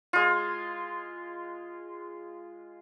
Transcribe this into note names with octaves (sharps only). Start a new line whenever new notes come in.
G#3 F4